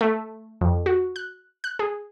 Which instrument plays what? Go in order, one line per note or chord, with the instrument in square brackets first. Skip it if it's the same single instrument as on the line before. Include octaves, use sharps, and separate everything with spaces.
[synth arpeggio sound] A3
F2
F#4
F#6
F#6
G#4